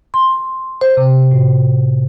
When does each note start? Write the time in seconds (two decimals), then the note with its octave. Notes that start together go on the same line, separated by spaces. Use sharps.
0.14 C6
0.81 C5
0.97 C3
1.31 A2